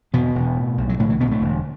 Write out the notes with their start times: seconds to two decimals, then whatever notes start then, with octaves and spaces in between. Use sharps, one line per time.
0.13 E2 B2 B3
0.35 E1
0.57 A2
0.78 B1
0.89 F#3
0.99 A2 D3 A3
1.10 E3
1.20 B2 D3 B3
1.31 A2 A3
1.42 E1